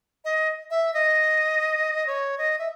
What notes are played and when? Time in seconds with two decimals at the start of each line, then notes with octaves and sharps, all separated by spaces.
0.25 D#5
0.70 E5
0.94 D#5
2.07 C#5
2.38 D#5
2.58 E5